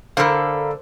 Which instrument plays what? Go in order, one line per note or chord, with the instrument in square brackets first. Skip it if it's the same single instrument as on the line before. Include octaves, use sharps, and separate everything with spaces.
[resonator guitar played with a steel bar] D3 A4 [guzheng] A#4 C5 [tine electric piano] F5 A#5 B5